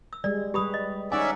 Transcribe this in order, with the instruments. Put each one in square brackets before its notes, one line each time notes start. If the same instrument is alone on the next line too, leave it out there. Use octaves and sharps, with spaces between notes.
[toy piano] E6
[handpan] G3 G#3 [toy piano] D5
[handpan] G3 B4 [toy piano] G4 B5 D#6
[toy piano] D#5
[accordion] C#4 D5 E5 [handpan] D#4 F#5 [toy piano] G#5